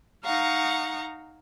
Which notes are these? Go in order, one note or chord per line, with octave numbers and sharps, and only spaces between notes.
D#4 F5 F#5 A#5 C#6